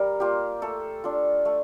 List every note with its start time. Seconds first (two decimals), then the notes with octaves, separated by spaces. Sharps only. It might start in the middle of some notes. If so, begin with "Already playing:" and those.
Already playing: G3 A#4
0.20 A#3 F4 G4
0.62 A3 A4
1.04 D4 F4
1.45 A3